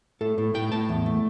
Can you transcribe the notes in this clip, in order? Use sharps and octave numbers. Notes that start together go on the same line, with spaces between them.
A2 A4
A2
A2 G5
A2 A5
E2
A3